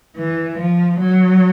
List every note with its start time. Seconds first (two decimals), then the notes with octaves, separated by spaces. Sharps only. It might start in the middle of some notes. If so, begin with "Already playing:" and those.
0.16 E3
0.59 F3
1.00 F#3